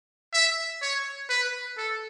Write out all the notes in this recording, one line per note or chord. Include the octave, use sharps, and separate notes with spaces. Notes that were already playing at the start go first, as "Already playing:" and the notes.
E5
C#5
B4
A4